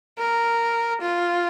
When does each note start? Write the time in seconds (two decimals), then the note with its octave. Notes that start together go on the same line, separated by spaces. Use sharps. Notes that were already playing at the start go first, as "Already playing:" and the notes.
0.19 A#4
1.02 F4